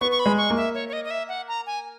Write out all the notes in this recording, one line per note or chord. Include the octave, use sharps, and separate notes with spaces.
B3 C#6
C#6
B5
G#3
C#6
A#3
E5
C#5
C#5
D#5
D#5
E5
F#5
A#5
G#5